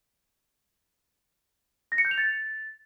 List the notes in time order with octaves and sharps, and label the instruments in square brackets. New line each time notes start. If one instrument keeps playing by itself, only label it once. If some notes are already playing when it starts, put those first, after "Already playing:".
[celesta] A#6
C#7
G6
F7
A6